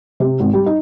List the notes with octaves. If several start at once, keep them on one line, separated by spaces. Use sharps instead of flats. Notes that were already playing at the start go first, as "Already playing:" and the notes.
C3
G#1
G3
D#4